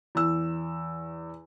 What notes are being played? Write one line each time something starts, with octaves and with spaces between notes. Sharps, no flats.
E2 E6